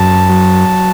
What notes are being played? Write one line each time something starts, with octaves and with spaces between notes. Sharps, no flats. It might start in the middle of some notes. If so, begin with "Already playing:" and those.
Already playing: F#2 A5
F#3